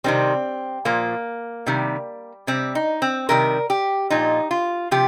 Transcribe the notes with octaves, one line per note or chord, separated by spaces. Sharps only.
C3 D#3 G3 C4
A#2 F3 A#3
C3 D#3 G3
C3 G3 C4
D#4
C4
C3 D#3 G3 A#4
G4
A#2 F3 D#4
F4
C3 F3 G4